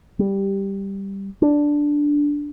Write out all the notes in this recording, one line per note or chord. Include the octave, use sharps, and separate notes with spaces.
G3
D4